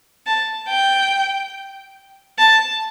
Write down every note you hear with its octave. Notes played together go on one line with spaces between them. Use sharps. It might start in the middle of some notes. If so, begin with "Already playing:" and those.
A5
G5
A5